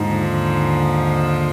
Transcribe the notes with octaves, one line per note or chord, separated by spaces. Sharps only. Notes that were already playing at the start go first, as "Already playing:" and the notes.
Already playing: D#2 G#2 D3 F3